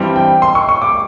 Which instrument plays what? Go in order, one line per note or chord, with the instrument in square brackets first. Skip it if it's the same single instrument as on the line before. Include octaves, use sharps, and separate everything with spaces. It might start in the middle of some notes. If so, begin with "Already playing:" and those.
Already playing: [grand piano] G2 E3 G3 C4
[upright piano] G5
C6
C#6
C#6
D6